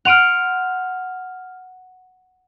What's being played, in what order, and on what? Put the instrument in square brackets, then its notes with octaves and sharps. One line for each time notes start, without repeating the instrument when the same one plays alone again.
[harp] F#5 C6 D7 [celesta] F6 D#7 F7